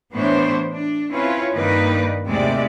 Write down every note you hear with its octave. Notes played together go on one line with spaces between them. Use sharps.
A2 E3 B3 D4 C5 C#5
D4
C4 C#4 E4 F4 B4 C#5
G2 D#3 A#3 D#4 B4 D5
D#2 A2 C3 G#3 D5 E5